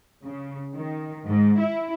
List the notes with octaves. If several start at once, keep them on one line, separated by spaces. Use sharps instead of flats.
C#3
D#3
G#2
E4